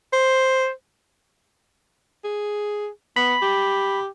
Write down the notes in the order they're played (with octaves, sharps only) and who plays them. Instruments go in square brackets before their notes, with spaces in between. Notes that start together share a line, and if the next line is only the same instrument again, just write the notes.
[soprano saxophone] C5
[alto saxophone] G#4
[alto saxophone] B3 [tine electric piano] B5
[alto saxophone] G4